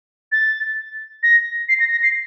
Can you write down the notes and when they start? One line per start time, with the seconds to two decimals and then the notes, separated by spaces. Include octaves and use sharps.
0.32 A6
1.23 A#6
1.69 C7
1.80 A#6
1.92 A#6
2.03 C7